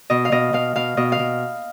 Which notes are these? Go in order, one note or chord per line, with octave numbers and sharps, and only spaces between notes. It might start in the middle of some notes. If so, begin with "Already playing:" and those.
B2 D#5
F5
B2 D#5
B2 F5
B2 F5
B2 D#5
F5
B2